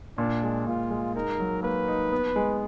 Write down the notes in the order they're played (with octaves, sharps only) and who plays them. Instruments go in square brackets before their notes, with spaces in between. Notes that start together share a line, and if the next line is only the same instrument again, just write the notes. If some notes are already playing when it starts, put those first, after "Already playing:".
[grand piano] A#2 [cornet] D4
[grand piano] G#3
[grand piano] A#2 [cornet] F4
[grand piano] G#3
[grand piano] D#4 [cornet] A#4
[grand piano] F#3
[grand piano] A#3 [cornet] B4
[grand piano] D#4
B3
G#3